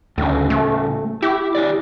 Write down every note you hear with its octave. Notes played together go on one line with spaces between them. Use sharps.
D2 A2 C#3
A3
E4 G4
E4 C#5 D5